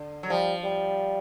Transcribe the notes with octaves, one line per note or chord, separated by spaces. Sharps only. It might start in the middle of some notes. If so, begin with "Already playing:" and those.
Already playing: D3
F#3
F3 G3
G3